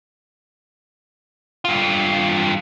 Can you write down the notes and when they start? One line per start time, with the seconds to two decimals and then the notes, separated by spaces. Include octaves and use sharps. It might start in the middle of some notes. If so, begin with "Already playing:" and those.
1.65 G2 F4